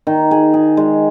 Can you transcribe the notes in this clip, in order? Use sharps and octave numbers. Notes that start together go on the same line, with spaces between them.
D#3
G#4
G#4
G#3